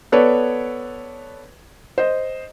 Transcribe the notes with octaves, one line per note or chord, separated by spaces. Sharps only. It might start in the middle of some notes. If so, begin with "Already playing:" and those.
B3 A4 B4 C#5 D5
C5 D#5